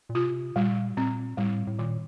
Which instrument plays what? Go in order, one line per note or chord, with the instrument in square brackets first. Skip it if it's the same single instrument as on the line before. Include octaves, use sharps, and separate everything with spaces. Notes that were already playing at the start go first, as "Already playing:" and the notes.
[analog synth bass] A#2
[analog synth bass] C3 [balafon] F4
[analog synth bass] A#2 [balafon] G3
[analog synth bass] A#2 [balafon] C4
[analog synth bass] A2 [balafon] G3
[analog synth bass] A2
[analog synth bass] A#2 [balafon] D#3